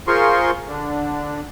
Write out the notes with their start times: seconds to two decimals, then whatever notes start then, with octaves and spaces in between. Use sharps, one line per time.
0.07 F4 G#4 A#4 C5 C6 C#6
0.68 D3 D4